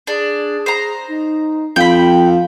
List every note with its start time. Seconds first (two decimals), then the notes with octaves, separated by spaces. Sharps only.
0.07 D4 G#4
0.66 C5 A#5
1.08 D#4
1.76 F2 F5 G5 B5